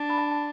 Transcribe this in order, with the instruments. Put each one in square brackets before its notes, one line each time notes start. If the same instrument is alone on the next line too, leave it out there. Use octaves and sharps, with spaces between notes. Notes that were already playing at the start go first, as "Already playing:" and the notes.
Already playing: [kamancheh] D4
[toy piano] B5
A5
A5